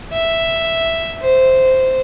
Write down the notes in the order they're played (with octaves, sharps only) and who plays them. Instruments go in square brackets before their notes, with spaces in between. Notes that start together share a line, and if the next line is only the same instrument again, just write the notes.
[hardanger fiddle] E5
C5